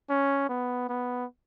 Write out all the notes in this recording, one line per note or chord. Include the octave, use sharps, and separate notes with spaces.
C#4
B3
B3